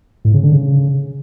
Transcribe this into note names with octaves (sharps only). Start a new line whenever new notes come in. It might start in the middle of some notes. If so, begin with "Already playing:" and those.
A2
C#3
D3
C#3